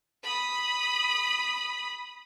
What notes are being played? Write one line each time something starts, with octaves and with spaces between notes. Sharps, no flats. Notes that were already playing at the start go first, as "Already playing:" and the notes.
B5 D#6